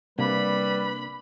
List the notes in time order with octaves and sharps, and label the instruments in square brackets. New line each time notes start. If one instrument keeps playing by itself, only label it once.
[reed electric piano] C3 A#3 D4 [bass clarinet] G3 [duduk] B4 [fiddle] B5